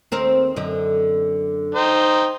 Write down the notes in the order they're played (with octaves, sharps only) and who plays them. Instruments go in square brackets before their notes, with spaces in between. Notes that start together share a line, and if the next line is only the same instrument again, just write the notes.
[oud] D#2 C4 A#4
F#2 D3 D#5
[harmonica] D#4 C5 G5